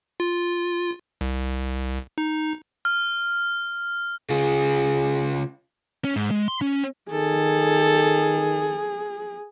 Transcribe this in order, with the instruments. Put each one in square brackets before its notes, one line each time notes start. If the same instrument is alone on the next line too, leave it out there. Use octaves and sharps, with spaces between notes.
[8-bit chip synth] F4
C2
D#4
[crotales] F6
[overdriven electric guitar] C#3 F4 [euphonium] G#4
[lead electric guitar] C#4
G#2
G#3
C6
C#4
[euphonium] D#3 [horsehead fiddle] G#4 [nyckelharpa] A4